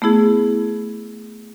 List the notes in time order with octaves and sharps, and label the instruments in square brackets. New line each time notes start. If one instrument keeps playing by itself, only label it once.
[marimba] A3 B3 E4 G#4